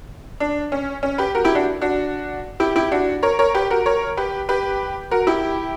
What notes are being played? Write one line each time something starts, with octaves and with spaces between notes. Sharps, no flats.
D4
C#4
C#4
G4 B4
F#4 A#4
E4 G4
D4 F#4
D4 F#4
E4 G4
E4 G4
D4 F#4
A#4 C#5
A#4 C#5
G4 B4
F#4 A#4
A#4 C#5
G4 B4
G4 B4
F#4 A#4
E4 G4